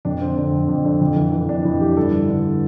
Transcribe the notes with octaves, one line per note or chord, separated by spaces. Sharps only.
F2 D4
D3 C4
D3 D4
F2
F2
D3
F2
E3
E3
F2 D4
F2 E4
E3 G4
G2 A4
D3
D3